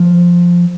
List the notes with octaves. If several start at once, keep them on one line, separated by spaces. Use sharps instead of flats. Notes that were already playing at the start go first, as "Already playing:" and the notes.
Already playing: F3